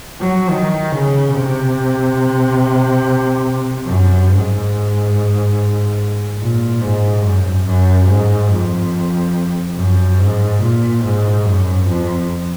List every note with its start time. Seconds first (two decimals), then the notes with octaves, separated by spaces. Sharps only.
0.21 F#3
0.50 D#3
0.92 C#3
1.34 C3
3.86 F#2
4.29 G#2
6.39 A#2
6.81 G#2
7.24 F#2
7.65 F#2
8.07 G#2
8.50 F2
9.76 F#2
10.18 G#2
10.61 A#2
11.02 G#2
11.45 F#2
11.87 F2